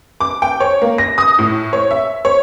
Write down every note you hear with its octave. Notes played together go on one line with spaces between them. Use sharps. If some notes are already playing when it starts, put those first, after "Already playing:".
D6
G5
C#5
A#3
A#6
D#6
A2
C#5
E5
C#5